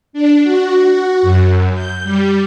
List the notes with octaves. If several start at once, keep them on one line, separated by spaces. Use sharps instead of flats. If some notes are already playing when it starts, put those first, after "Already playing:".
D4
F#4
F#2
G6
G3